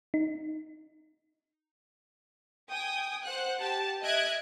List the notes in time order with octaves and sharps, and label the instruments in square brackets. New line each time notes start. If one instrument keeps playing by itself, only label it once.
[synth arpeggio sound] D#4
[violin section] G5 G#5 D#6
C5 F#5 F#6
G4 A5
D#5 E5 F#6 G#6 D7